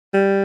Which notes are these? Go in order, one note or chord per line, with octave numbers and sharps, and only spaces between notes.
G3